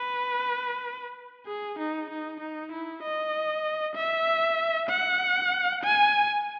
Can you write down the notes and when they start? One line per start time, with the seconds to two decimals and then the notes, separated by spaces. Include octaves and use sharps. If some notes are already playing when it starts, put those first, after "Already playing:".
Already playing: B4
1.47 G#4
1.79 D#4
2.10 D#4
2.40 D#4
2.72 E4
3.03 D#5
3.96 E5
4.89 F#5
5.84 G#5